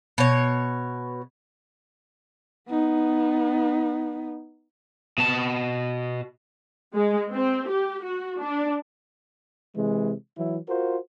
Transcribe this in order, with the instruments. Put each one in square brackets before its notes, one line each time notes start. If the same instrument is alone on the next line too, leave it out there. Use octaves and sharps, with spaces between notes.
[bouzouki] B2 C#5
[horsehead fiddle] B3 D#4
[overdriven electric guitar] B2 A5
[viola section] G#3
C4
G4
F#4
D4
[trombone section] C3 E3 G#3
E3 F#3 E4
F4 F#4 A#4 C5